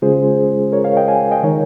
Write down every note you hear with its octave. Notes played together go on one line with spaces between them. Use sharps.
C#3 G#3 C#4 F4 G#4 C5
A#4 C#5
C#5 F5
D#5 G5
F5 G#5
D#5 G5
D#3 G#3 D#4 A#4 C#5